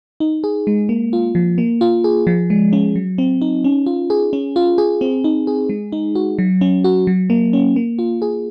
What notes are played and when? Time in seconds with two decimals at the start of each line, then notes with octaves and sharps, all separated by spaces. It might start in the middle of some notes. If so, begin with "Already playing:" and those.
0.20 D#4
0.44 G#4
0.67 G#3
0.89 A#3
1.13 F4
1.35 F3
1.58 A#3
1.81 F4
2.04 G#4
2.27 F3
2.50 G#3
2.73 C#4
2.96 F#3
3.18 C4
3.41 D#4
3.64 C#4
3.86 F4
4.10 G#4
4.33 C#4
4.56 F4
4.78 G#4
5.01 C4
5.24 D#4
5.47 G#4
5.69 G#3
5.92 D#4
6.15 F#4
6.39 F#3
6.61 C#4
6.84 F#4
7.07 F#3
7.30 A#3
7.53 C#4
7.76 A#3
7.99 F4
8.22 G#4